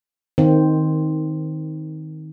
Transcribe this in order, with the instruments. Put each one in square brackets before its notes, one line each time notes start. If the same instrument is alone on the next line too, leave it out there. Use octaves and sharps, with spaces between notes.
[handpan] D#3 C4